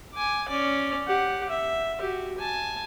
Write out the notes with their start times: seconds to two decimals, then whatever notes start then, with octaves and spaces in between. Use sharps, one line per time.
0.14 G#5 D6
0.49 C#4 D5
1.07 G4 F#5
1.49 E5
1.99 F#4 G4
2.39 G#5 A5